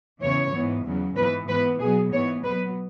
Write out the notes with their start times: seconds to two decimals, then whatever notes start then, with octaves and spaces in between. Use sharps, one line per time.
0.21 E2 C#3 E3 C#5
0.52 G#2 E3 B3
0.85 E2 C#3 F#3
1.16 G#2 E3 B3 B4
1.48 G#2 E3 B3 B4
1.80 B2 F#3 B3 G#4
2.11 G#2 E3 B3 C#5
2.43 B2 F#3 B3 B4